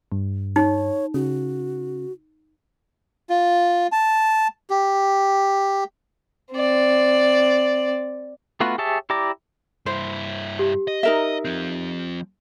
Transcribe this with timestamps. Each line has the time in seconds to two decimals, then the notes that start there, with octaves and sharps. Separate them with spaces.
0.12 G2
0.56 D#4 C#5
1.14 C#3 F#4
3.30 F4
3.92 A5
4.70 G4
6.53 C4 D5
8.60 A3 B3 F4 F#4 B4
8.78 G4 G#4 C#5 E5 A5
9.10 E4 G4 D5 A#5 D6
9.86 G2 E4 C5
10.59 G4
10.88 D#5
11.03 D#4 A#4 E5
11.45 F3 C4